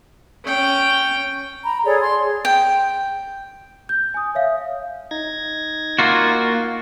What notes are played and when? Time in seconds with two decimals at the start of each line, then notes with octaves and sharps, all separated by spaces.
0.44 C#4 G5
1.63 A#5 B5
1.84 G#4 A4 C#5 D5
2.01 C6
2.23 G#4
2.45 G5
3.89 G6
4.14 G#5 D#6
4.35 C#5 E5 F5
5.11 D#4 G#6 A#6
5.99 A#3 F4 F#4